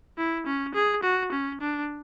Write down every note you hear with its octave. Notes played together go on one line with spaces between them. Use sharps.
E4
C#4
G#4
F#4
C#4
D4